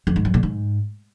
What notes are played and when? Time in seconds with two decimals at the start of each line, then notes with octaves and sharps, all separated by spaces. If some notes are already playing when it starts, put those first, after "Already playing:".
0.07 F2
0.16 G#2
0.25 F#2
0.34 A#2
0.43 G#2